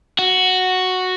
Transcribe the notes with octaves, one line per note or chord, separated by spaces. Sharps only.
F#4